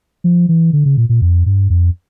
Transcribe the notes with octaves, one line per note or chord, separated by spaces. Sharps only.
F3
E3
D3
C#3
A#2
A#2
F2
G2
F2